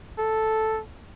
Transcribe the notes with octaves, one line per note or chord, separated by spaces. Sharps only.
A4